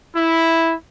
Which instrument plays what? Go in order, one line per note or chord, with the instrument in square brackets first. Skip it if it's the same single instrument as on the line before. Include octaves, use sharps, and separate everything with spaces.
[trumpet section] E4